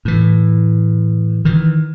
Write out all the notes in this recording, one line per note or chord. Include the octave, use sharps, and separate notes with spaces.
A2 E3
D#3 E3